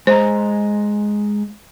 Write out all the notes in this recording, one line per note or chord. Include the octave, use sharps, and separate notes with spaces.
G#3 C5 D#5 A#5